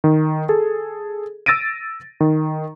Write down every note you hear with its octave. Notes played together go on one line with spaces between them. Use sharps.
D#3
G#4 A4
E6 A6 A#6 D7 D#7
D#3